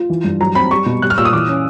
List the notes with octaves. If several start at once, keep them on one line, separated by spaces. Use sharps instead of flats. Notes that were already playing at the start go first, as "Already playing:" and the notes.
Already playing: F4
E3
G2
F#3 A#5
C4 B5
G3 C#6
B2
G3 F#6
F6
A#2 E6
D#6
E3 D6
C#4